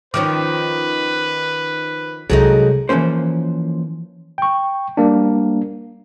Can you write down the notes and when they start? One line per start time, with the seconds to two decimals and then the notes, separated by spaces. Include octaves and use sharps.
0.14 D#3 F3 C#4 B4 D6
2.30 C2 F#3 G#3 D#4 G#4 A4 C#5
2.89 E3 F3 A#3 C#4 C5
4.38 G5 C#6
4.97 G3 A#3 D4